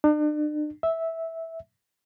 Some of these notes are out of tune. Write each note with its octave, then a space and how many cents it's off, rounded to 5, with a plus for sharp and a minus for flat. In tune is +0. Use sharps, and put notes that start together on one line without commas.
D4 +40
E5 -10